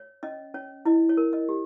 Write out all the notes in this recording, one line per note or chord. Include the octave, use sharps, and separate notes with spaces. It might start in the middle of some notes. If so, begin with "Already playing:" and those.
Already playing: C#5
C#4 D#5
C#4 C#5
E4 D#5
C#5
A#4
D#5
G4